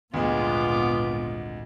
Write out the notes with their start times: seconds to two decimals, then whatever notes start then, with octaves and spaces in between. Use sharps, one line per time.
0.14 G#1 D2 A#2 G#3 B3 F4 D6